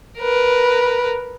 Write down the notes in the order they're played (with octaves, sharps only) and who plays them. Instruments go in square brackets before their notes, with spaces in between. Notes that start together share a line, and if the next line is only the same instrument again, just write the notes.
[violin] A#4 B4